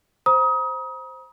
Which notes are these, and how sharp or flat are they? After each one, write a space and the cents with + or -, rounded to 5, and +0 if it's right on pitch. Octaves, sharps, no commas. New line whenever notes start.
C5 +0 A#5 +45 D#6 +25